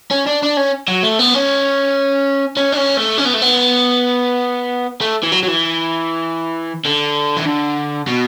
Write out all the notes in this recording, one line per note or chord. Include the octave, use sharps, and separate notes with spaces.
C#4
D4
D4
C#4
F#3
A3
B3
C#4
C#4
D4
C#4
A3
C#4
B3
A3
B3
A3
E3
F#3
F#3
E3
D3
E3
D3
B2